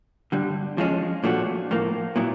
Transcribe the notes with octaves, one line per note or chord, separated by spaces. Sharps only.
G2 D3 G3
F3 G#3 C#4
A#2 F3 A3 D4 F#4
A2 F3 A#3
A#2 F#3 B3 E4